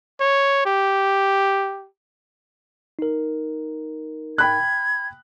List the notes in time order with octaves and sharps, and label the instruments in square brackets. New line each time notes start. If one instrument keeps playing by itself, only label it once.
[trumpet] C#5
G4
[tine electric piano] D#4 A#4
[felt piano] G5 B5 F#6 [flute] G#6